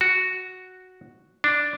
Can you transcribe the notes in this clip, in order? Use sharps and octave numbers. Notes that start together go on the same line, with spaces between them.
F#4
D4